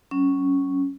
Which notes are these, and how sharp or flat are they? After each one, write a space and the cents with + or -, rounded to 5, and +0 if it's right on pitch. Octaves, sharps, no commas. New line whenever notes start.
F#3 +35 C#4 +0